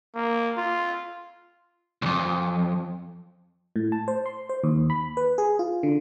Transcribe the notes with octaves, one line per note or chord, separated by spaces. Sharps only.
A#3
F4
C2 F2
A2
A5
C5
C6
C5
D#2
B5
B4
G#4
F4
D3